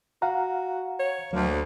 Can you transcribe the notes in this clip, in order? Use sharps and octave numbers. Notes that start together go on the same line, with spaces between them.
F#4 F5 F#5 A#5
C#5
D2 F#3 A#3